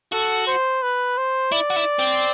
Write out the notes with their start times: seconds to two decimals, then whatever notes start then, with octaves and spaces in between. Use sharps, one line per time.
0.12 F#4 A4
0.47 C5
0.83 B4
1.18 C5
1.52 E4 D5
1.70 F#4
1.76 E4
1.99 C4